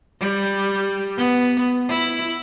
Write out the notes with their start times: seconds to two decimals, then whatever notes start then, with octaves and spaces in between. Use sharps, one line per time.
0.21 G3
1.17 B3
1.89 E4